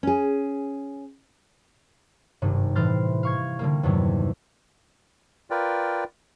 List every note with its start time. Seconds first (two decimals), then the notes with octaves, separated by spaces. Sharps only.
0.03 C#4 G#4
2.42 G#1 G2 C3 D#3
2.75 A2 E3 C5 F6 A6
3.23 F5 C#6 G#6
3.59 D3 G3 A#3
3.83 E2 G2 C3 D#3 F#3
5.51 F4 A#4 B4 D5 G5